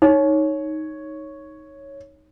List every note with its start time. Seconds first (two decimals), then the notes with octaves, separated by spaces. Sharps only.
0.02 D#4 C#5